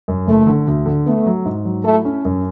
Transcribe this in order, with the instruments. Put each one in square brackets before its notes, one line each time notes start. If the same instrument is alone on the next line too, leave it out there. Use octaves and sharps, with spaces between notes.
[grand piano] F#2
[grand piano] F#1 [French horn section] A3
[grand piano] D3
D2
D3
[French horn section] A3 [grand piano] B3
[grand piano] F#3
G#2
F#3
[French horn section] A3 [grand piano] E4
[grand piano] C#4
F#2